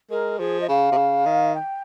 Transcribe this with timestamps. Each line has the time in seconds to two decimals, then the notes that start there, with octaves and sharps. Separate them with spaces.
0.10 G#3 A#4
0.39 F3 G#4
0.61 D#5
0.68 C#3 F5
0.92 C3
0.97 C#3
1.26 D#3
1.54 G5